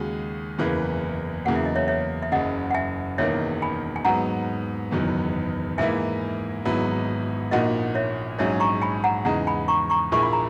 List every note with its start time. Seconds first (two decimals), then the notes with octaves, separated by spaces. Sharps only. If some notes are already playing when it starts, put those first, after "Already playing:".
Already playing: D#2 C#3 G#3 D#4 F#4
0.58 F#1 E2 C#3 E3 A#3
1.45 E2 C#3 F#3 A#3 F#5
1.56 E5
1.66 D#5
1.76 C#5 E5
1.88 C#5 E5
2.22 E5
2.32 F#1 F#2 C#3 D#5 F#5
2.71 F#5
2.75 E5 G#5
3.18 E1 E2 D#3 A#3 C#5 E5
3.62 G#5 B5
3.96 G#5
4.05 G#2 F#3 B3 F#5 A#5
4.91 F#1 E2 D#3 F#3 B3
5.78 G#2 E3 A#3 E4 E5 G#5
6.65 G#1 G#2 F#3 B3 E4
7.51 A#1 A#2 A#3 D#4 F#4 D#5 F#5
7.95 C#5 E5
8.38 A#1 G#2 F#3 C#4 G#4 C#5 E5
8.60 A#5 C#6
8.82 G#5 B5
9.04 F#5 A#5
9.25 E2 C#3 G#3 D#4 F#5 A#5
9.47 G#5 B5
9.68 A#5 C#6
9.90 A#5 C#6
10.12 A#1 A#2 A#3 E4 G#4 C#6
10.23 B5
10.33 A#5